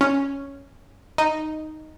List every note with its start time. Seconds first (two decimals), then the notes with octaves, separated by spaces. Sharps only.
0.01 C#4
1.18 D#4